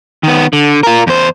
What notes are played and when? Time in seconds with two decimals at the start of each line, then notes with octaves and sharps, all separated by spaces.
0.23 D#3 B3
0.53 D3
0.83 F4 A#4
1.07 E2 C5